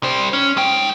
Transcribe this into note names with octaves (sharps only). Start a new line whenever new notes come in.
G3 C5
C#4
G#3 G5